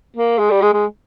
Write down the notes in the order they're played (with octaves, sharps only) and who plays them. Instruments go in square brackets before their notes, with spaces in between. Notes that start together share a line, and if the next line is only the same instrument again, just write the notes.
[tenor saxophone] A#3
G#3
G3
G#3
G#3